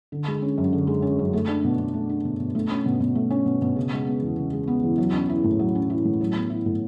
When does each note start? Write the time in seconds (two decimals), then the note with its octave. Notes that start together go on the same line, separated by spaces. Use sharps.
0.12 D3
0.27 G#3
0.42 C#4
0.58 F#2
0.73 D3
0.87 G#3
1.02 C#4
1.19 F#2
1.33 A3
1.48 D4
1.64 B2
1.79 B2
1.94 A3
2.09 D4
2.25 B2
2.40 B2
2.55 A3
2.71 C#4
2.86 B2
3.00 B2
3.15 A3
3.30 C#4
3.46 B2
3.62 B2
3.76 C#3
3.92 G#3
4.07 B3
4.22 E2
4.38 C#3
4.53 G#3
4.68 B3
4.84 E2
4.98 F#3
5.13 C#4
5.29 E4
5.44 A2
5.59 F#3
5.75 C#4
5.90 E4
6.05 A2
6.21 F#3
6.36 B3
6.50 E4
6.66 A2